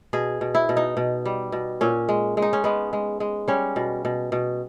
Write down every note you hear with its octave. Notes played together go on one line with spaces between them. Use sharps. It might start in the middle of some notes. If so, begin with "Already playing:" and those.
B2 G#4
B2
E4
B2
D#4
B2
G3
B2
A#2 C#4
G#3
G#3
D#4
C#4
G#3 B3
G#3
G#3
G3 C#4
B2
B2
B2